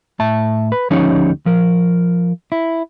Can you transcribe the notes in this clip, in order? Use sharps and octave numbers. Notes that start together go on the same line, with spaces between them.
A2 E5 A5
B4
D2 F3 C#4 D#4 G4 C#5
F3 A#4
E4